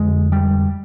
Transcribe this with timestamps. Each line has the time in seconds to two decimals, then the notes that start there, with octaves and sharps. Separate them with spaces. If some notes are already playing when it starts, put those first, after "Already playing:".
Already playing: F2 D3 G#3
0.32 G3